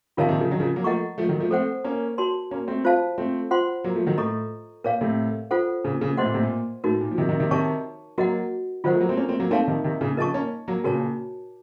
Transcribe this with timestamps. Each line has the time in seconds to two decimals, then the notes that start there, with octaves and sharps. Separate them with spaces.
0.17 C3 D#3 F4 A#4 C#5 F5 A5
0.29 C3 D#3
0.40 C#3 F3
0.51 D#3 F#3
0.60 C#3 F3
0.76 F#3 A#3
0.84 F3 A3 A#4 D#5 F#5 A#5 C#6
1.18 F3 A3
1.29 D#3 F#3
1.40 F3 A3
1.51 A3 C4 A4 C5 F#5
1.84 A#3 C#4
2.18 F#4 A#4 C#5 A5 C6
2.51 A#3 C#4
2.68 A3 C4
2.85 F4 C5 F5 A5
3.18 A3 C4
3.51 F4 C5 F#5 C6
3.84 F#3 A#3
3.95 F3 A3
4.06 D#3 F#3
4.18 A2 A4 D#5 A#5 C#6
4.84 A#2 A#4 C#5 F5
5.01 A2 C3
5.51 F4 A4 C5 F#5
5.84 A#2 C#3
6.01 A#2 C#3
6.17 A2 C3 C5 D#5 F#5 C6
6.26 A#2
6.34 A2 C3
6.43 A#2
6.84 A2 D#4 F#4 A#4
7.01 A#2
7.11 F3
7.18 C3 D#3
7.29 C3 D#3
7.40 C3 D#3
7.51 C3 D#3 A#4 C#5 A5 C#6
8.18 F#3 A#3 F#4 A#4 D#5 F#5
8.84 D#3 F#3 F4 C5 F#5
8.93 F3 A3
9.01 F#3 A#3
9.09 A3 C4
9.17 A#3 C#4
9.28 A3 C4
9.40 F#3 A#3
9.51 A3 C4 D#4 A#4 C#5 F5 A5
9.67 C3 D#3
9.84 C3 D#3
10.01 A#2 C#3
10.17 C#3 F3 A#4 D#5 A5 C#6
10.34 A#3 C#4
10.68 F#3 A#3
10.84 A#2 C#3 F#4 A#4 C#5 A5